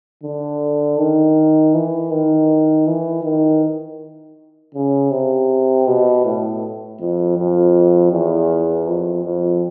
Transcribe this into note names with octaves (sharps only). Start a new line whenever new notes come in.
D3
D#3
E3
D#3
E3
D#3
C#3
C3
B2
A2
F2
F2
E2
F2
F2